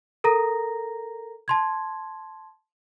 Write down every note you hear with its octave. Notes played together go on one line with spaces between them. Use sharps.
A4 A#4 A#5 A#6
A5 C6 G#6